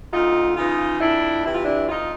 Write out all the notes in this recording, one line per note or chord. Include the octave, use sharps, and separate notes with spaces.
D2 D#4 F4
C#3 E3 D#4 F4
F2 D4 E4
C3 E3 E4
F4
D4 E4
F2 D#4 F4